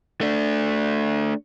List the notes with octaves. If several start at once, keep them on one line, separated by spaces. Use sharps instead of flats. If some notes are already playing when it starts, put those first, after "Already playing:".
A3 D4